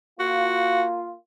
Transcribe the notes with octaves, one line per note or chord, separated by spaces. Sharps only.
A#3 F4 F#4